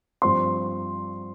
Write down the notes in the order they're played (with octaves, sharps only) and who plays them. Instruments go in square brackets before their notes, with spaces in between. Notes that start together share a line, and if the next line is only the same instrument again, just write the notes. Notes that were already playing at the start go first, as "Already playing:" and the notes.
[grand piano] G2 F3 C4 C6